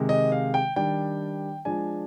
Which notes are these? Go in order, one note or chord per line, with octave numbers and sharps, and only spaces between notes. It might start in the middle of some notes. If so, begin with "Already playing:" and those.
Already playing: C3 D#3 G#3
D#5
F5
G5
D#3 G3 D4 G5
F3 G#3 D4 G#5